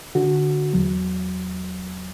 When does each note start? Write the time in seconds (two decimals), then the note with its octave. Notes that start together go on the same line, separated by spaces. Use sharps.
0.15 D3 F#4
0.73 E2 F#3